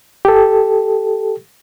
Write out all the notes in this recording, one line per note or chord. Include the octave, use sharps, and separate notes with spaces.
G4 A4